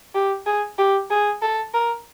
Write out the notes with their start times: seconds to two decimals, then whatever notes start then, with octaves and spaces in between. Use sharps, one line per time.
0.15 G4
0.46 G#4
0.78 G4
1.11 G#4
1.42 A4
1.74 A#4